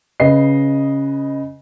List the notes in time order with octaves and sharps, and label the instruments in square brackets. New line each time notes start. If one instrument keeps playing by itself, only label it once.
[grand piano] C#3 B4 D#5 C7